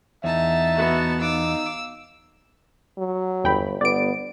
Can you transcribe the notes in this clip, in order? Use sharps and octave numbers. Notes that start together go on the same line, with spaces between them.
E2 D#4 E5 A5
B3 F#4
D#4 F5 D6 E6
F#3
G1 E2 G5 B5
G1 B3 D5 D7